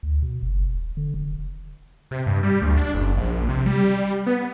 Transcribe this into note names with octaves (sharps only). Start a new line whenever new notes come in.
D2
B2
F#1
E1
D3
E1
C3
G2
G3
D2
D4
F#1
A#1
C3
G3
B3